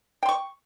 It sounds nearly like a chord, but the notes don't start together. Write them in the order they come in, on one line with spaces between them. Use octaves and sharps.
G5 C6 C#6